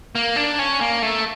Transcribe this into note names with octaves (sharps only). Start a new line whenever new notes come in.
A#3
D4
C#4
A#3
A3